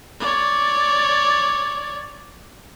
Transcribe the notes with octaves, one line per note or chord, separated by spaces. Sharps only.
C#5 D5